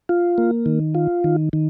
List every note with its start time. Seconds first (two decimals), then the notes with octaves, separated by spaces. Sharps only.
0.09 F4
0.38 A#3
0.66 D#3
0.95 F4
1.24 D#3
1.53 D#3